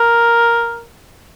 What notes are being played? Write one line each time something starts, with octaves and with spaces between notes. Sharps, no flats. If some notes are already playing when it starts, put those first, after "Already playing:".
Already playing: A#4